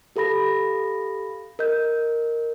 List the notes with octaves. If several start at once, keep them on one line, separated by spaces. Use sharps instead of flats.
G4 A4 F5 B5 A#6
A#4 D#5 G6